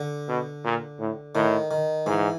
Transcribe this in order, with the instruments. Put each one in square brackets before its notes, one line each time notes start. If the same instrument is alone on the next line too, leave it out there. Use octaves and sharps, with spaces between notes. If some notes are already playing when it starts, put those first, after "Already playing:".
Already playing: [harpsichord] D3
[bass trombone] B2
A#2
A2
[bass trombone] A2 [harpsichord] D#3
[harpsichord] D#3
[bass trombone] G#2 [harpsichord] E3